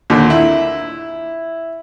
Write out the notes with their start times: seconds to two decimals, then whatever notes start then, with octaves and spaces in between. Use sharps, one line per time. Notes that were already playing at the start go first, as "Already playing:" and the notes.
0.10 D#2 A#2 D3
0.30 E4